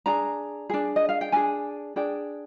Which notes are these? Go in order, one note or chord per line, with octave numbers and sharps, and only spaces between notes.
D4 G#4 A#5
D4 G#4
D#5
F5
G5
D4 G#4 G#5
D4 G#4 G5